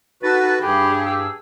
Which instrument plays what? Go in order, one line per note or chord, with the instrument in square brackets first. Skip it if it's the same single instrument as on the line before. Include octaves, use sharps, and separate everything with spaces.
[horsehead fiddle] D#4 A4 [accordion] F#4 B4 [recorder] A6
[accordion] G2 [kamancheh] G4 [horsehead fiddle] G#4 [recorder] B5
[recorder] E6